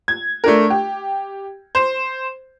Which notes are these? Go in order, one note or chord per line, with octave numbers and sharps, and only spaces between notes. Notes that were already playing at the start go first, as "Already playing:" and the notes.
G#6
A3 D4 A#4
G4
C5